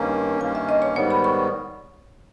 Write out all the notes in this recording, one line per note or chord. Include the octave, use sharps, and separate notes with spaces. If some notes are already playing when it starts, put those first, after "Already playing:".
Already playing: G2 D#3 A#3 C#4 A#5
G2 D#3 A#3 C#4 G#5
E5
D#5
C#5
G#2 D#3 G3 B3 C#5
B5
C#6